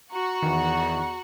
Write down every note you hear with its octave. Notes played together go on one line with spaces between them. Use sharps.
F#4 F#5 A#5 C#6
E2 D#3 E3